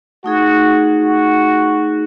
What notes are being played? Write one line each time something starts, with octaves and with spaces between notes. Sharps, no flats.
A3 D#4 F#4 G#4
F#4